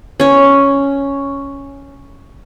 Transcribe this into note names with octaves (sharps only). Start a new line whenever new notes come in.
C#4 C#5